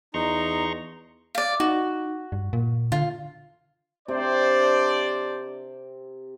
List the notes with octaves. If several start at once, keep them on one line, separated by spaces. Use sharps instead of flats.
E2 D#4 A#5 C6 C#6
D5 F5
D#4 F#4
G2
A#2
D3 F4
C3 D4 C5 D5